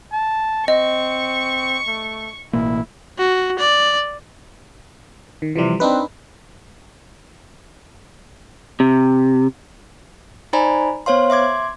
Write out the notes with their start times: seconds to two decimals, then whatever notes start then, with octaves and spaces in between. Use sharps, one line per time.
0.12 A5
0.68 C4 D#5 C#6
1.87 A3
2.53 A1 B2 A#3 E4
3.19 F#4
3.59 D5
5.42 D#3
5.56 C3 E3 F3 G3
5.80 C4 D4 D#4 B4
8.80 C3
10.53 D#4 C5 D5 G#5 A#5 B5
11.06 B3 C5 C#5 F5 C6
11.30 E5 C6 D6 G#6